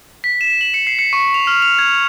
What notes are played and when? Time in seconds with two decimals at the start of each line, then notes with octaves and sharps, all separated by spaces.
0.24 B6
0.41 E7
0.61 F#7
0.74 C#7
0.87 C7
0.99 C#7
1.13 C#6
1.34 F7
1.47 F6
1.62 F7
1.79 G#6